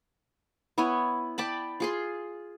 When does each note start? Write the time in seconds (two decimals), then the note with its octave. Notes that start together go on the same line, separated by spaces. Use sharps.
0.78 B3 E4 C#5 G#5
1.38 D5 G5 A5 B5
1.80 F4 G#4 C6